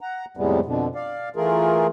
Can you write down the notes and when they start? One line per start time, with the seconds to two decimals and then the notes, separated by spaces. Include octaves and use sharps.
0.01 F#5 A#5
0.37 F2 A2 C3 G3 G#3 B3
0.65 F2 B2 D3
0.95 D5 F5
1.36 E3 A3 F4 G#4 A#4